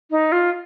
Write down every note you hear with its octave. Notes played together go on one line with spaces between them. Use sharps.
D#4
F4